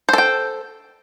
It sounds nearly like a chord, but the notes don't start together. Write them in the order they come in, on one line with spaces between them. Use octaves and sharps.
C5 A4 G5